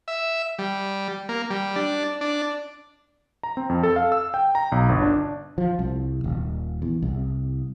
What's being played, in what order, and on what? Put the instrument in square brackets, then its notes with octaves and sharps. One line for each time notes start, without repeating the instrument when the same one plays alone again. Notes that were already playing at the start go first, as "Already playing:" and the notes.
[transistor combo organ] E5
G3
A#3
G3
D4
D4
[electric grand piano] A#5
C4
F2
A4
F5
E6
G5
A#5
B1
G1
D4
[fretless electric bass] F3
C2
D#1
E2
C2